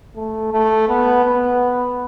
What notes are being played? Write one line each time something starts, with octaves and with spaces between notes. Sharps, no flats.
A3
A3
B3
B3